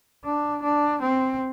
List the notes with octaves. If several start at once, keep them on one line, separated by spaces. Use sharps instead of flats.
D4
D4
C4